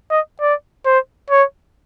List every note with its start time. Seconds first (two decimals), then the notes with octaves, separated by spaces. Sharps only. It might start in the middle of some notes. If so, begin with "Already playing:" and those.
0.11 D#5
0.41 D5
0.86 C5
1.30 C#5